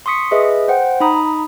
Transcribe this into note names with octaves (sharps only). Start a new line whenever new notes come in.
C6 C#6 D#6 B6 C#7
G#4 B4 D#5 E5
C5 F#5 G5
D#4 A#5 B5 D#6